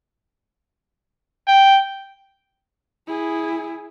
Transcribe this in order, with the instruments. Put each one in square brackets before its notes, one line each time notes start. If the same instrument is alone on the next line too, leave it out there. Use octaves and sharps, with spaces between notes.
[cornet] G5
[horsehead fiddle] E4 G#4